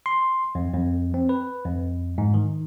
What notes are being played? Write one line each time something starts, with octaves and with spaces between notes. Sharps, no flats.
C6
F2
F2
C4
B4
F2
G#2
D#3